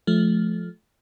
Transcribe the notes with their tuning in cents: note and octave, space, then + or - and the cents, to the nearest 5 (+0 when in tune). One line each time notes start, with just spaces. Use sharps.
F3 +0 A3 -25